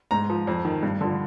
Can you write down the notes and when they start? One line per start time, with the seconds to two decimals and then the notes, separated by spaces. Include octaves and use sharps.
0.11 G#2 A#5
0.30 F3
0.47 F2
0.65 D#3
0.83 G2
1.01 D3 F3